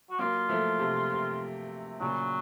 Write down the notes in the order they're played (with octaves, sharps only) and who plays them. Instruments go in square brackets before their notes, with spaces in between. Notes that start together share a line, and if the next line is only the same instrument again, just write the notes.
[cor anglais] F#4
[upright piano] F#3 A#3 [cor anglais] F4
[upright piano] F3 A3
C3
C3
[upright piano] A#2 C#3 [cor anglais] F#3